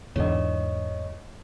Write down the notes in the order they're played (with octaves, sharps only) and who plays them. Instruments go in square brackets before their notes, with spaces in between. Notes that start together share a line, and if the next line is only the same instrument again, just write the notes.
[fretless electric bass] E2 G#2 D3 [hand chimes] C#5 D#5